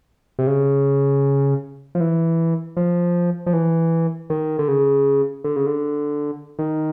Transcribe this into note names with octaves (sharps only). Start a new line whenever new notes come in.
C3
C#3
F3
E3
F3
F3
E3
D#3
D3
C#3
D3
C#3
D3
D#3